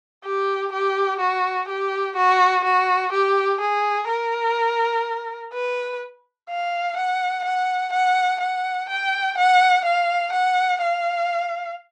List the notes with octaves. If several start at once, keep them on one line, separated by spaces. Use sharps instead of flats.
G4
G4
F#4
G4
F#4
F#4
G4
G#4
A#4
B4
F5
F#5
F#5
F#5
F#5
G5
F#5
F5
F#5
F5